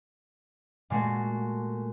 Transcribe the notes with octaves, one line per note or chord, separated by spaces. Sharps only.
A#2 G#3 A3 F#4